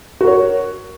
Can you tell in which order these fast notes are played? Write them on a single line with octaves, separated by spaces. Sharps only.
F#4 A#4 C#5